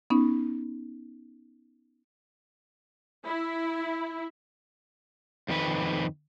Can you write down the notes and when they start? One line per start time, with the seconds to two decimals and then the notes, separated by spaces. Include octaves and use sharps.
0.10 B3 C#4 D#4
3.25 E4
5.48 F2 D#3 B4